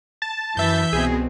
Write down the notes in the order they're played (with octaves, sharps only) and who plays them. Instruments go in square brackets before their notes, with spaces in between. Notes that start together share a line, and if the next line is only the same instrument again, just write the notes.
[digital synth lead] A5
[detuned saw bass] F#2 [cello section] E3 [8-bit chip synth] E5 G6
[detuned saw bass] C2 [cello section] B2 C4 [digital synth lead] G#4